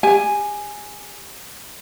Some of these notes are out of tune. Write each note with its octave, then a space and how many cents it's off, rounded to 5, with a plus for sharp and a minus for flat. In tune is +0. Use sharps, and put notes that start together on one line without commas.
G4 +35 G#5 +0